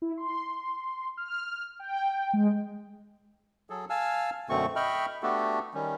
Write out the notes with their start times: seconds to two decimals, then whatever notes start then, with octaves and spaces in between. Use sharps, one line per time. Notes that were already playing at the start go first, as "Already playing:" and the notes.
0.02 E4
0.18 C6
1.17 F6
1.79 G5
2.33 G#3
3.70 F#3 G#4 A4
3.90 F5 G#5 A5 E6 F6
4.49 F#2 B2 D3 A3 C4 C#6
4.76 D#5 E5 G5 B5 C#6 F6
5.23 A3 B3 D4 F#4 G4 A4
5.74 D#3 G3 C#4